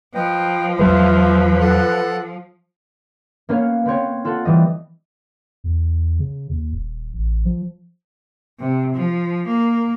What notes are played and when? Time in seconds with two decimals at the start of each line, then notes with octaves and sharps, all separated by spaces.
0.14 F3 B4 D#5 G5
0.79 E2 F#3 G#3 B4 C5 E5 F5
1.60 A4 F#5 F#6
3.49 A#3 B3 C#4 C#5 F5
3.86 B3 C4 C#5
4.25 F4 A4 F#5
4.45 E3 G3 D#5
5.64 E2
6.19 C#3
6.50 D#2
6.73 D#1
7.14 A1
7.45 F3
8.60 C3
8.94 F3
9.47 A#3